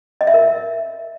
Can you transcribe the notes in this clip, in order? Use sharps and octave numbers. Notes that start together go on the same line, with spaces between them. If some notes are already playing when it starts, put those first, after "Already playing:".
D#5
E5
A#4